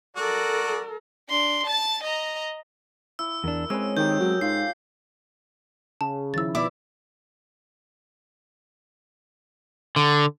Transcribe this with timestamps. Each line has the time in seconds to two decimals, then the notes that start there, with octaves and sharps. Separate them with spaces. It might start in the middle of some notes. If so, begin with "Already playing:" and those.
0.17 F#4 A4 A#4 D5
1.29 D4 C6
1.66 A5 A6
2.04 D#5 A#5
3.19 E4 E6
3.44 E2 D4 A#4
3.70 G#3 C4 C#4 B4 E6
3.97 D#3 G4 A#4 D#5 G6
4.20 F#3
4.41 G#2 F4 C7
6.01 C#3 A5
6.34 D#3 F3 E4 E6 A6
6.55 B2 B3 E4 D5 E5 D6
9.96 D3